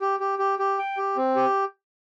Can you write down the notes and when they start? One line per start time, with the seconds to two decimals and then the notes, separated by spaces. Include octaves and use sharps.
0.01 G4
0.20 G4
0.39 G4
0.59 G4
0.79 G5
0.97 G4
1.16 C4
1.36 G4